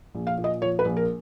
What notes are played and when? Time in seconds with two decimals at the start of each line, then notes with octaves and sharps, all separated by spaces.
0.15 A#1
0.27 F5
0.38 A#2
0.44 D#5
0.62 F3 C#5
0.79 B4
0.85 A#1
0.97 A#4